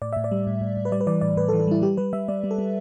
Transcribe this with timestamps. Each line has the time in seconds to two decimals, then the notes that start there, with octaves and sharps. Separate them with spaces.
0.02 A2 D5
0.13 A2 E5
0.24 D5
0.31 G3
0.47 A2
0.61 A2
0.77 A2
0.85 B4
0.92 G3 D5
1.01 B4
1.07 E3 D5
1.21 A2 D5
1.37 A2 B4
1.48 A4
1.53 E3
1.60 A4
1.67 G3 E4
1.82 G3 G4
1.97 G3 B4
2.13 G3 E5
2.28 G3 D5
2.44 G3
2.51 A4
2.58 G3